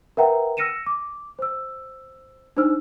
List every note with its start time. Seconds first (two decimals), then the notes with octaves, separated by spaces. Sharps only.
0.17 A#4 B4 E5 F#5 G5 A#5
0.57 E6 F6 A#6 C#7 D#7 E7
0.86 D6
1.39 C5 E6
2.57 D4 D#4 C5 E6 F6